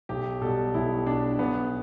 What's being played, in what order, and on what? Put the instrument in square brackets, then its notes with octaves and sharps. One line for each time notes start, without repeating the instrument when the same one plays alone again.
[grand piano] B1 G4
B2 G3 A4
B1 E4
B2 G3 D4
B1 B3